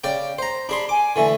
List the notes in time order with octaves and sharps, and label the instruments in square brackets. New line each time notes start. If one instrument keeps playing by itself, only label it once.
[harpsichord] C#3 D5 G5
C5 A#5
[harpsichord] D4 G#4 C6 [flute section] B5
[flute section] G#5 [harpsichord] D6
[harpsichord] D3 E3 A3